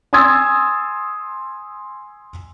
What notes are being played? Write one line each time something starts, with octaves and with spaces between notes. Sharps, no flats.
G#5 C6 D#6 E6 G#6 A6